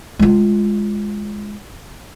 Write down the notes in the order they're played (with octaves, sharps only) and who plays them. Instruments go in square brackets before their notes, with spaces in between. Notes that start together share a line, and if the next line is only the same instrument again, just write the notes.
[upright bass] G#3 F4